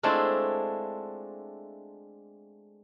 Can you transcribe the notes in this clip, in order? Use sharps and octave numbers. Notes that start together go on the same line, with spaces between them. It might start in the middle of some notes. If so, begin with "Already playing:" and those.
G#3 A3 C4 D4 E4 F4